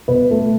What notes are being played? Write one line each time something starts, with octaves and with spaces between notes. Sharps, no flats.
B2 B4
A3